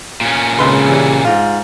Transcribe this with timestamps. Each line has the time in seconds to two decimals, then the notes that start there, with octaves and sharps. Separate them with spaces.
0.21 A#2 C#4
0.59 G#1 C#3 B4 C6
0.87 E3 G3
1.25 G#2 F4